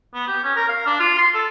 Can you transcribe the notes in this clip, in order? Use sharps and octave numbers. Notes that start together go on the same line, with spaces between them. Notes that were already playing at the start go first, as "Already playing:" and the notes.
B3
G4
C#4
A#4
F5
D4
F4
C6
A4